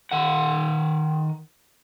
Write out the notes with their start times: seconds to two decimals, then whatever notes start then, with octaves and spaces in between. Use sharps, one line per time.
0.12 D#3 F#5